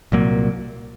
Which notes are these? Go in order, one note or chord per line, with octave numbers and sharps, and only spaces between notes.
C2 A#2 F#3 A#3